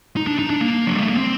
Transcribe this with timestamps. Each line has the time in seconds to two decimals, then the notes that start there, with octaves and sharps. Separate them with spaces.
0.17 D#4
0.27 D4
0.39 D#4
0.50 D4
0.61 A#3
0.87 F#3
0.95 G3
1.01 A3
1.09 A#3
1.17 C4